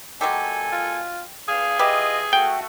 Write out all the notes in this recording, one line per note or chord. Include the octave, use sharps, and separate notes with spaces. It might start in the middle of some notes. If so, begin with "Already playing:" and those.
A#2 F#3 G#3 G4 A4 G#5
F4
G2 G#4 F5
E3 F4 G4 B4 D#5 E5
A3 F#4 G5